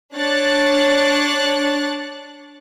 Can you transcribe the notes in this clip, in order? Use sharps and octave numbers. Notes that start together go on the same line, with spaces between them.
D4 C#5 F#6 A6